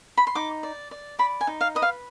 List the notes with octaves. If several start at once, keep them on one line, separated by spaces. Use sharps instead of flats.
B5
C6
D#4 D6
D5
D5
D5 B5
G#5
D#4
F5
B4 D#5
F5